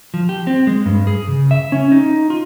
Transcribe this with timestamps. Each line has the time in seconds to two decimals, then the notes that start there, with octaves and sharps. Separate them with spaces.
0.14 F3
0.29 G4
0.47 C4
0.67 G#3
0.86 G2
1.07 G#4
1.28 C#3
1.51 E5
1.72 C#4
1.92 D#4
2.30 F4